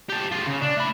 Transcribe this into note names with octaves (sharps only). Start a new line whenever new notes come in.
G4 A4
F4 G#4
C#3
D4
A3 B5